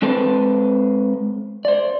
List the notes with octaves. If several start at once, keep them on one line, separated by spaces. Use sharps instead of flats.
G#3 C4 A4 B4 C5
C5 D5